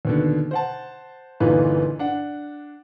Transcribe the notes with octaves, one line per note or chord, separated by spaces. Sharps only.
D#2 B2 D3
C5 F#5 A5
G1 A#2 E3 D#4 B4 F5
D4 F#5